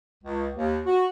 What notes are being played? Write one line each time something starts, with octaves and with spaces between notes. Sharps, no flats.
C#2
D#2
F#4